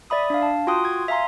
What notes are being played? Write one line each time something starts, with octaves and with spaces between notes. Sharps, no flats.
D5 E5 B5 D#6
D4 F5
A5
F4 F#4 G5 C6 D#6 F#6
G#6
E5 F5 G#5 A#5 C6